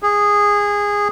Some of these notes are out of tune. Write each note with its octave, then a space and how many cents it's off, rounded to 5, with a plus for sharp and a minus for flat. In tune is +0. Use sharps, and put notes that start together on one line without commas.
G#4 -15